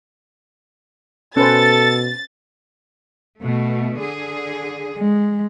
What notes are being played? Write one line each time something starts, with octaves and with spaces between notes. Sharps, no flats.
B2 C#4 A4 B4 C5 A6
B2 A3
D3 G#4
G#3